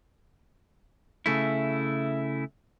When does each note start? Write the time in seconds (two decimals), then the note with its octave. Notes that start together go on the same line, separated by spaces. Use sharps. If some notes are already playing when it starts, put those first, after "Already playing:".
1.26 C#3 A3 E4